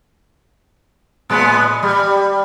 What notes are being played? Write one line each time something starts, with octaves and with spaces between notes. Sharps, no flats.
A2 G#3 B3
G3